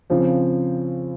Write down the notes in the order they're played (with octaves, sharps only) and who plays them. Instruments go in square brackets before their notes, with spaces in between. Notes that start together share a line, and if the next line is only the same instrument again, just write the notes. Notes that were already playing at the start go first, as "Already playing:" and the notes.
[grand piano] C#3 F3 C4